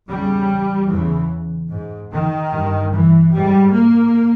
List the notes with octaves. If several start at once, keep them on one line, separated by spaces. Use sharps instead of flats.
E2 C#3 G3
E2 C#3 E3
G#2
D#3
G2
E3
G#2 G3
A#3